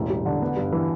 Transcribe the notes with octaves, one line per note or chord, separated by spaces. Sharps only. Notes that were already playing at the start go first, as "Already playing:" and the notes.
Already playing: E1 A1
G3
D3
B3
G2
E3